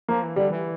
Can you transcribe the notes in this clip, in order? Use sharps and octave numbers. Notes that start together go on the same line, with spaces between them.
F3 A#3
E3
D3 G3
E3